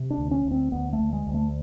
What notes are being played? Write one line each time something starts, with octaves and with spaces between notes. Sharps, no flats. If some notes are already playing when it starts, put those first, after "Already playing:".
Already playing: C3
D4
D2
C#4
D2
C4
D2 B3
A3
D2
G#3
D2
A3